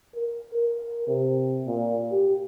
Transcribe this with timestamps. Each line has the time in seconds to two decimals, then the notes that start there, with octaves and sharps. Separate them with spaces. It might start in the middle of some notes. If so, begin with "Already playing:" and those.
0.15 A#4
0.55 A#4
1.07 C3
1.66 A#2
2.11 G4